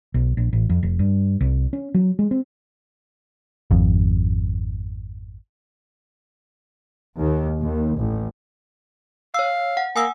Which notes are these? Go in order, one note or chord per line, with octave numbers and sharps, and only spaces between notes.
B1
A#1
A1
F2
F1
G2
C2
C#4
F#3
G#3
C4
G#1 F2
D#2
D#2
A1
C#5 F5 E6
F#5
A#3 G#5 D#6 E6